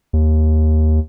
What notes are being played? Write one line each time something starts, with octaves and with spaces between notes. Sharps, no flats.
D#2